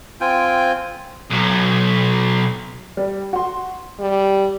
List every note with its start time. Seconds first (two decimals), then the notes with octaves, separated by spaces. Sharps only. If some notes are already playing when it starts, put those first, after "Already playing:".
0.21 C4 F4 G5 G#5
1.31 B1 F#3
2.97 G3
3.33 F#4 C6
4.00 G3